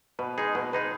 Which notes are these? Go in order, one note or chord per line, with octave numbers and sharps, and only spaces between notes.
B2 B4
G#3 D#4 G#4
B2 B4
G#3 D#4 G#4 B4